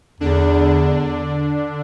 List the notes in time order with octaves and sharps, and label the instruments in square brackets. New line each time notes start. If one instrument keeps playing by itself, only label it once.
[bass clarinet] E2 [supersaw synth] D3 D4